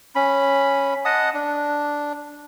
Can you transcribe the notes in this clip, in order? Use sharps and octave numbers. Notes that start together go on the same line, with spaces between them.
C#4 B5
D#5 F#5 A5 D#6
D4